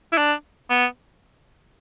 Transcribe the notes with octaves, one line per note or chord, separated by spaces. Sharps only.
E4
D4
B3